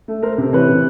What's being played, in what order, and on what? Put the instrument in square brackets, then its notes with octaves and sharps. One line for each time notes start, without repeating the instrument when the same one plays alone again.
[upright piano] A3
A3 A#4 C5
C3
E3 B4 C#5
C3